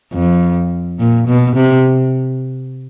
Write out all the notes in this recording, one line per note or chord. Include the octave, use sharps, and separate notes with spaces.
F2
A#2
B2
C3